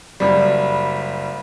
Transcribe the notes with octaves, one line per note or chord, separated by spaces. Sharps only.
F#1 G3